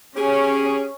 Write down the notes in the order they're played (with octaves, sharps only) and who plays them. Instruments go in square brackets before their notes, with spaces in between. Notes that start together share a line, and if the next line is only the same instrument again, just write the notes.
[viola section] C#4 [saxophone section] G4 G#4